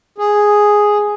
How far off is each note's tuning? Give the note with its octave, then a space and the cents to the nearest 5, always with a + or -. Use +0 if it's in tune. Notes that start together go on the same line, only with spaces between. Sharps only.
G#4 +0